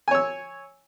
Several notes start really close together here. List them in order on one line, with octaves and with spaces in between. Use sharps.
G#5 C#5 E6